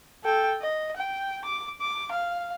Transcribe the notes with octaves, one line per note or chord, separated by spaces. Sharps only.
A4 G5
D#5
G5
D6
D6
F5